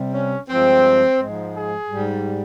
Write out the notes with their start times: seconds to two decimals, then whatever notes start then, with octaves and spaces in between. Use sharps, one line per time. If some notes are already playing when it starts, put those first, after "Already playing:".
Already playing: C3 G3
0.13 C#4
0.48 G2 F3 G#3 C4
1.18 G#2 F3 G#3
1.54 G#4
1.89 G#2 G3